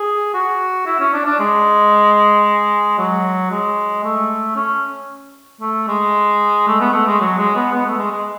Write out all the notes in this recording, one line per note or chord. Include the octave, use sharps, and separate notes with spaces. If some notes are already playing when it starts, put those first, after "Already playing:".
Already playing: G#4
F#4
E4
C#4
D4
D4
G#3
F#3
G#3
A3
C#4
A3
G#3
A3
B3
A3
G#3
F#3
G#3
B3
B3
A3
G#3
G#3